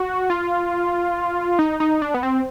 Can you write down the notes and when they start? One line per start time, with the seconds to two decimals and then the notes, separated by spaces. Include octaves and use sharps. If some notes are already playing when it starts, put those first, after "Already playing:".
Already playing: F#4
0.30 F4
1.59 D#4
1.80 D#4
2.02 D4
2.14 B3
2.23 C4